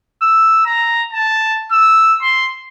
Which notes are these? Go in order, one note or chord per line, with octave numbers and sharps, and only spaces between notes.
E6
A#5
A5
E6
C6